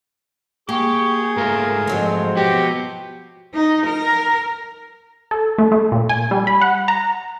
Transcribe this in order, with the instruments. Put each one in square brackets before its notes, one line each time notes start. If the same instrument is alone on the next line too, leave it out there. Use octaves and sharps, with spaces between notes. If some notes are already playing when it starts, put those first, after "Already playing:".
[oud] A#3 [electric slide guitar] G4 [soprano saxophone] G#4 [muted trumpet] C#6
[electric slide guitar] G#2 A3 F4 [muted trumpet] A#4
[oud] F3 F#3 G#3 [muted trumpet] C4
[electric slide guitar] B3 F#4 [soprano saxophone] G4
[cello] D#4
A#4
[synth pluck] A4
A3
A3
A#2
G#5
G3
B5
F#5
A#5